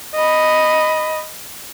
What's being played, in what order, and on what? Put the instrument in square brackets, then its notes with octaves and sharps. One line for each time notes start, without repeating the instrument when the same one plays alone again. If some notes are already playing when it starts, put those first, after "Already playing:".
[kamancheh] D#5 B5